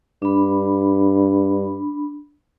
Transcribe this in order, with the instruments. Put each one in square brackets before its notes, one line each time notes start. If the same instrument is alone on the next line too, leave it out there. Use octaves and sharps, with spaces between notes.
[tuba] G2 [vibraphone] D4 B5